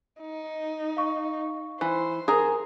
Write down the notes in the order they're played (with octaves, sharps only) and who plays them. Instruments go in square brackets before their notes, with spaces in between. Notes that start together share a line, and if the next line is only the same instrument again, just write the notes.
[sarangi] D#4
[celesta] F5 C#6
[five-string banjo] E3 [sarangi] C5
[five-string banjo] G#4 A#4 [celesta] D#6